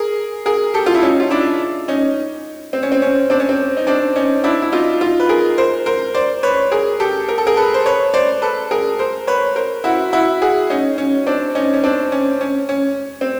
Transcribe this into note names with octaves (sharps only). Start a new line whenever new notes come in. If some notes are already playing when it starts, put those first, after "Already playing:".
Already playing: G#4 A#4
G#4 A#4
G4 A4
F4
E4
C#4 D#4
F4
D4 E4
C#4 D#4
C4
C#4
C4
C#4
C4 D4
C#4
C4
D#4
C4 D4
C#4 D#4
D4 E4
E4
D#4 F4
D#4 F4
B4
G#4 A#4
A#4 C5
A#4 C5
C5 D5
B4 C#5
G#4 A#4
G4 A4
A#4
A4
G#4 A#4
A4 B4
C5
B4 C#5
C5 D5
A4 B4
G#4 A#4
A#4 C5
B4 C#5
A#4 C5
E4 F#4
E4 F#4
F#4 G#4
C#4 D#4
C#4
C4 D4
C#4 D#4
C#4
C4 D4
C#4
C#4
C#4
C4